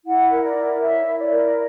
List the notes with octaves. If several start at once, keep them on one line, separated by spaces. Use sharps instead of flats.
E4 F#5
A#4
D5
E4
C#5 E5
E4
D5
A#4